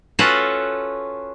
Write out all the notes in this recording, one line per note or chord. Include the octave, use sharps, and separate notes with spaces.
C#4 F4 F#4 A4 B4